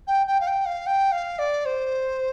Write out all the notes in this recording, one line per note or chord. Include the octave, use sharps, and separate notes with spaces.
G5
G5
F5
G5
F5
G5
F5
D5
C5